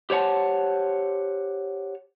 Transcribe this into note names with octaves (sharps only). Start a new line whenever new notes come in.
G4 C5 C#5 F#5 A5